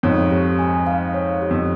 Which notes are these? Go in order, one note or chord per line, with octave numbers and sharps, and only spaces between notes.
F2 G#2 C#5
G4
G#5
F5
C#5
G4
F2